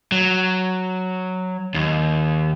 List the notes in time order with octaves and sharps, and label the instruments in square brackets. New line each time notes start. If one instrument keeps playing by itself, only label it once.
[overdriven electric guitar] F#3
D#2